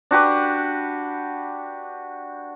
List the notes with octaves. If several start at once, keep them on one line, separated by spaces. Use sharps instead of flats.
D4 F#4 G4 B4